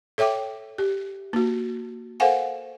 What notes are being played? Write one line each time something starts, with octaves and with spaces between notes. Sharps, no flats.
A4 C#5 E5 G5 D6
G4
A#3 F#4
A4 A#4 C5 F5 F#5 G#5